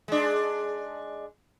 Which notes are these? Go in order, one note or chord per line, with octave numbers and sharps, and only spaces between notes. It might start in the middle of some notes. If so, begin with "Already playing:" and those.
G#3 D4